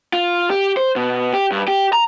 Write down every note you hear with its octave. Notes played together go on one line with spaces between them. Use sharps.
F4
G4
C5
B2
G4
G2
G4
A#5